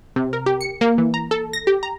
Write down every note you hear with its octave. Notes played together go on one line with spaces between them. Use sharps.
C3
A#4
G4
C#7
A#3
E3
A#5
A4
A#6
G4
A#5